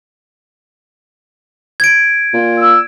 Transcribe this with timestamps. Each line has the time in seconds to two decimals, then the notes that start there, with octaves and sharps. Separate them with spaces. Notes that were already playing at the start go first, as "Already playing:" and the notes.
1.80 G#6 D7
2.33 A#2
2.59 E6